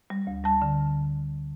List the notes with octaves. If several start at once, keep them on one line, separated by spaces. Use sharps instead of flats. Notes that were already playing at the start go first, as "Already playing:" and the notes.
G3
D2
G3 A5
D3